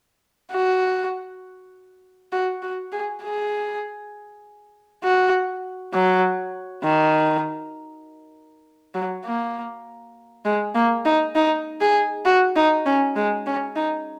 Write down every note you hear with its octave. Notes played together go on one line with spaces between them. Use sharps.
F#4
F#4
F#4
G#4
G#4
F#4
F#3
D#3
F#3
A#3
G#3
A#3
D#4
D#4
G#4
F#4
D#4
C#4
G#3
C#4
D#4